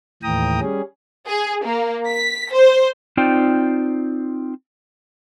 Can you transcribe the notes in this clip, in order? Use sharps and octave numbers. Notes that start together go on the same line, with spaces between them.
D#2 A2 E3 G5 A#5 D#6
G3 C#4 G#4
G#4
A#3
B6
C5
C4 D#4 F4 C5 D5 G5